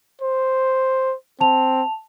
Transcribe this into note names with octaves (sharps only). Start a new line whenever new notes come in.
C5
C4 A5 F7